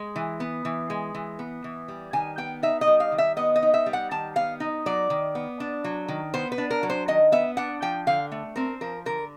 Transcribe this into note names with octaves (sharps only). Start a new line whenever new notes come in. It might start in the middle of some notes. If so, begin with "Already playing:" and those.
Already playing: G#3
E3
B3
E3
G#3
E3
B3
E3
G3
D#3 G#5
B3 G5
D#4 E5
D#5
G3
F5
D#3
E5
B3 D#5
D#5
D#4
E5
G3
F#5
D#3 A5
B3 F5
D#4
F#3 D5
D#3
B3
D4
F#3
D#3
B3 C5
B4
D4
A#4
F#3
C5
D#3 D#5
B3 E5
D4 F#5
F3 G5
D3 F5
A3
C4 A#4
F3 A#4
D3 A#4